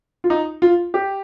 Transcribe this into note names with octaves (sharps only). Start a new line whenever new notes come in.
F4
D#4
F4
G4